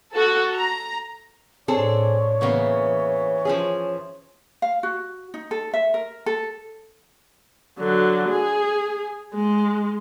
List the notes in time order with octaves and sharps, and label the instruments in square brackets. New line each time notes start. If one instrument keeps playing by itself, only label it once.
[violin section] F#4 A4
A#5
[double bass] A2 D4 [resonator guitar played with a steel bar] C4 G#4 A4 [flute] C#5
[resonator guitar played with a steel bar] C#3 A#3 B3 [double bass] E3
[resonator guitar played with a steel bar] F3 C#4 G#4
[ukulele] F5
F#4
D#4
A4
E5
A#4
A4
[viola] D3 F#3
G#4
G#3